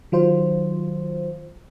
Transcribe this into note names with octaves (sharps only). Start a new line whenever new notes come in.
D#3 F#3 F4 C5